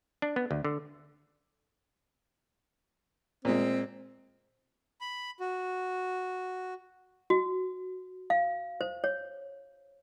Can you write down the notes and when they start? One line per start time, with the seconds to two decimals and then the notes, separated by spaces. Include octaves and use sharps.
0.22 D4
0.36 B3
0.51 D2
0.65 D3
3.45 A#2 G#3 C4
5.01 B5
5.40 F#4
7.30 F#4
8.30 F5
8.81 C5
9.04 C#5